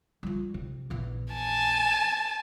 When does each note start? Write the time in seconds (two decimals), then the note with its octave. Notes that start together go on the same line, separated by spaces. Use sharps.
0.23 G3 F4
0.54 C3
0.90 A#1 E2
1.33 G#5 A5